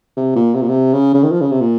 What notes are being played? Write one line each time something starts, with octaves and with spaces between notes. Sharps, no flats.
C3
A#2
C3
A#2
C3
C#3
C#3
D#3
F3
C#3
C3
A#2